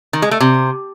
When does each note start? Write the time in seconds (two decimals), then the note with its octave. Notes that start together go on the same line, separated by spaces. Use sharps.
0.13 D#3
0.22 G#3
0.31 A3
0.40 C3